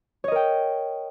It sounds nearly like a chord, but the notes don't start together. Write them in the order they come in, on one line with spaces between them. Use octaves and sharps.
C#5 D#5 A#4 G5